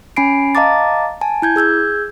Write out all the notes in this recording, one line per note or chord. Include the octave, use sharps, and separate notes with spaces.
C#4 G#5 B5 C7 D7
D#5 F5 A5 A#5 D6 A6
G#5 A5
E4 G6 G#6
G#4 E6 G6 G#6